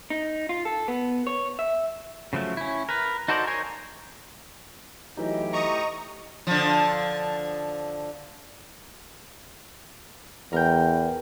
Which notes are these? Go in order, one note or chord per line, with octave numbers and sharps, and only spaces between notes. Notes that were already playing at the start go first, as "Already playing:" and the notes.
D#4
F4
A4
B3
C#5
E5
C#3 F3 F#3 A3
C#4 E4
A#4 B4
D#4 F#4 A4 C5 D5
D#4 A#4 C5 C#5 G#5
E3 F#3 A3 D#4 E4 G4 D#5
D#5 A#5 C#6 D#6
D3 F3
E2 A#4 G5